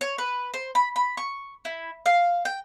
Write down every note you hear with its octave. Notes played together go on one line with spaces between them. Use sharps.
C#5
B4
C5
B5
B5
C#6
E4
F5
G5